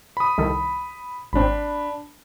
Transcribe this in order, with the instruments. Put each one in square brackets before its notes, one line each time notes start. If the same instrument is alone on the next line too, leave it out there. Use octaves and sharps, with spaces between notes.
[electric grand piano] B5 D#6
[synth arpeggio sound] C2 D#3 A4
[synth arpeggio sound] G#1 C4 [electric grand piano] D4 B5